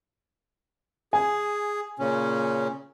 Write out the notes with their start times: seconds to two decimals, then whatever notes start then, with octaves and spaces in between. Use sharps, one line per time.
1.13 G#4 G#5
1.99 A#2 C#3 C#4